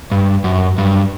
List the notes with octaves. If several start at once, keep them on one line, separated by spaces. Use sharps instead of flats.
G2
F#2
G2